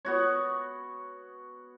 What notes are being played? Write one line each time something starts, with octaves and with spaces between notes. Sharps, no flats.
B3 F#4 C#5